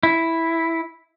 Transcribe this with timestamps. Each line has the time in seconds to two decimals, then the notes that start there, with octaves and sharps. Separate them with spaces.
0.03 E4